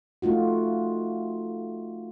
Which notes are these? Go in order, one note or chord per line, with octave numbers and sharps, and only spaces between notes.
A3 D#4 F4 F#4